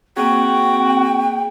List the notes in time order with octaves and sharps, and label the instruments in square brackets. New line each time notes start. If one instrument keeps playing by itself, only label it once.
[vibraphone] A#3 G#4 [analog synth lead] C4 [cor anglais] F#4 [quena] G5